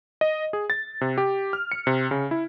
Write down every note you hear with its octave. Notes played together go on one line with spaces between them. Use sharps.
D#5
G#4
A6
C3
G4
F6
C#7
C3
C#3
E4